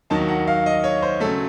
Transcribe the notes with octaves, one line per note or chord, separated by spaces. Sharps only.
D#2 D#3 F#3 A#3 D#4 A5
F#5
F5
D#5
C#5
C5
C#3 F#3 A3 A4